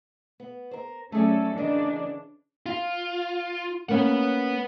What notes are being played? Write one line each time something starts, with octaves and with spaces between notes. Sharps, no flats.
B3
A#4 C5
F#3 A3 C#4 G#4 A4 D5
C#3 E3 D4 A#4 D5 D#5
F4
A#3 C#4 B4 F#5